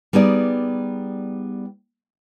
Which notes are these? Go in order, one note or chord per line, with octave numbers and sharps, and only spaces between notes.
G3 B3 D#4 G#4 D5